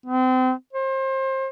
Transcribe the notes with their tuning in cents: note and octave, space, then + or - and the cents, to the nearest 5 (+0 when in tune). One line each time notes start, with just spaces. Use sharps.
C4 -30
C5 +30